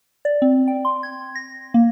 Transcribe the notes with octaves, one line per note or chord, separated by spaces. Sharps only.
D5
C4
G5
C6
G#6
A#6
A#3